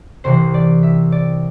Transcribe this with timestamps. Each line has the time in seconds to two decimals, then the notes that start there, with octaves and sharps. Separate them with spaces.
0.24 C2 C3 E3 C5
0.54 D5
0.83 E5
1.12 D5